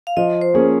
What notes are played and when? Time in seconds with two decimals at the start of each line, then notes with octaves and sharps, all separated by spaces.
0.07 F5
0.17 F3 D#5
0.41 C5
0.54 A#3 C#4 G#4